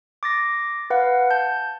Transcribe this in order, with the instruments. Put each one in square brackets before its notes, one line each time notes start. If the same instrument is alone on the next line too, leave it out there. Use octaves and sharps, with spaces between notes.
[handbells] D6 A6 A#6
B4 F5 F#5
A5 G6